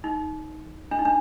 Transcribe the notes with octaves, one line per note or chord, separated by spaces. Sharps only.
D#4
D4
D#4
D4